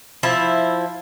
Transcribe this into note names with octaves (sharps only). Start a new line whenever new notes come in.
F3 E4